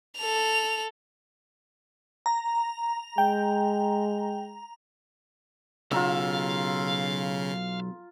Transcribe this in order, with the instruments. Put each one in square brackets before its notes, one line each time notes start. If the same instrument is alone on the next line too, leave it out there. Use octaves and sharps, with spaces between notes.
[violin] A4 F7
[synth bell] A#5
[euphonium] G#3 [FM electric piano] G5
[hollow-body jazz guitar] B1 [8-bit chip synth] C#3 [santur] F4 A#5 E6 [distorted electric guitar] F5